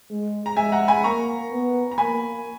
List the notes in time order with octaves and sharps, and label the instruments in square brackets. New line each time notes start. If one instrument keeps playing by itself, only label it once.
[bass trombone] G#3
[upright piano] A#5
[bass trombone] G#3 [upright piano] E5 G#5
[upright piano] F#5 A#5
G#5 B5
[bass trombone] A#3 [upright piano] A#5 C#6
[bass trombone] B3
[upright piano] A#5
[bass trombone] A#3 [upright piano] G#5 B5